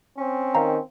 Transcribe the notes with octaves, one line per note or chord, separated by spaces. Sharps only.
C4 C#4
D#3 C5 F5 A#5